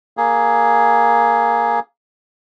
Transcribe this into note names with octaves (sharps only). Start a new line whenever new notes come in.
A#3 G#4